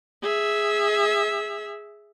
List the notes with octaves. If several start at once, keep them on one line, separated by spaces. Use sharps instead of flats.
G#4 E5